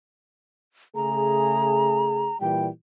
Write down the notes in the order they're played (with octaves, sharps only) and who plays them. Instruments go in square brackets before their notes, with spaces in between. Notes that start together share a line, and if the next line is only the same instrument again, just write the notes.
[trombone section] C#3 A3 G#4 [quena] A#5
[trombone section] A#2 E3 G3 [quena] G5